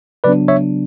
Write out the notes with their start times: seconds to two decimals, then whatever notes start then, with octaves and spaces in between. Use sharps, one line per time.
0.24 C#3 F#3 B3 D4 B4 D5
0.48 C#5 E5